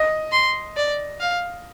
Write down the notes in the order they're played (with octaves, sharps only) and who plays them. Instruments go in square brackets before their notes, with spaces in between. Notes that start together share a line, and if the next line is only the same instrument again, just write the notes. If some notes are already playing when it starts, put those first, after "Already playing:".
Already playing: [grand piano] D#5
[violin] C6
D5
F5